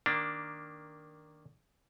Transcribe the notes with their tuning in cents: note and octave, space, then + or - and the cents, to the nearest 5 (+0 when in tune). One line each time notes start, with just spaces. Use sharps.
D#3 +0 A#3 +0 D4 +0